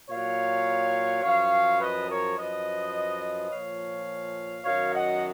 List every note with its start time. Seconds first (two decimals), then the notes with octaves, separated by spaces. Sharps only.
0.10 A#2 F#3 C#5 F5
1.23 F#2 F3 C#5 F5
1.81 B4 D#5
2.09 A#4 C#5
2.37 F#2 F3 B4 D#5
3.51 A#2 F3 C#5 F5
4.65 F#2 D#3 F#3 C#5 F5
4.94 D#5 F#5